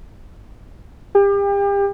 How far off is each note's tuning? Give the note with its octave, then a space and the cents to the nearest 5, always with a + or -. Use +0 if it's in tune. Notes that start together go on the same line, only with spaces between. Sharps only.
G4 +35